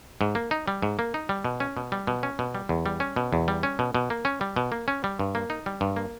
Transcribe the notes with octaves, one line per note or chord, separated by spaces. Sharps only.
G#2
A#3
D#4
G3
G#2
A#3
D#4
G3
B2
C#4
B2
G3
B2
C#4
B2
G3
E2
G3
C#4
B2
E2
G3
C#4
B2
B2
A#3
C#4
G3
B2
A#3
C#4
G3
G2
A#3
D#4
G3
G2
A#3